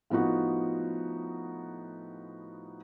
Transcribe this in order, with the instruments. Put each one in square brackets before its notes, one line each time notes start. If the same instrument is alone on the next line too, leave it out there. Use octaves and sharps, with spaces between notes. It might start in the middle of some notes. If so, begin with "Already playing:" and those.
[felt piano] A2 F3 B3 D#4 F#4